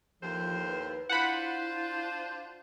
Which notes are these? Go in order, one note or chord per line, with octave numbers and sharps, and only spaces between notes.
D#2 A2 F3 C5
B4
D4 E4 F4 C5 F#5 B5